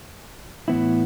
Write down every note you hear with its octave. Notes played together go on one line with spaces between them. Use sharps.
A2 E3 B3 E4